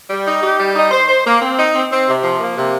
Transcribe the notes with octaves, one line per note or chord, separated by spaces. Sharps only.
G3
D#4
G4
G3
D#4
C5
C5
A#3
C4
D#4
C4
C4
C3
F3
A#3
C3